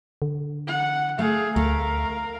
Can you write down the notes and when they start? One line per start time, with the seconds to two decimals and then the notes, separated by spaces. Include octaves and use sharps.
0.22 D3
0.67 F#5
1.19 A3 G#4 F5
1.56 D2 A3 A#4 F5